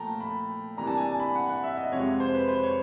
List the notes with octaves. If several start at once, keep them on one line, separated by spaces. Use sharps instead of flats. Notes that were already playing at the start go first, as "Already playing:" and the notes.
Already playing: A#2 F3 A3 G5 A5 A#5
B5
C3 E3 G3 A#3 D4 A#5
A5
G#5
A5
B5
F#5
F#5
E5
D#5
F2 C3 F3 G#3 C#5
C5
B4
C5
C#5